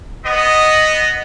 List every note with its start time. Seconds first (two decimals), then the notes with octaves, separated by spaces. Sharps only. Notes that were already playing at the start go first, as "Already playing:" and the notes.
0.24 B3 D#5